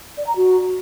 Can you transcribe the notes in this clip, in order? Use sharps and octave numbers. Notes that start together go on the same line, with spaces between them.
D5
A#5
F#4